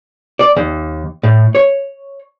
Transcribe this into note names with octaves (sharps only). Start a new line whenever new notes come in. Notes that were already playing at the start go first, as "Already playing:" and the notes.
D5
D#2
A2
C#5